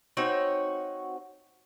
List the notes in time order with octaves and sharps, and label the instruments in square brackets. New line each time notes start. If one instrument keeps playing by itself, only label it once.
[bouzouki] C4 D#4 F#4 C#5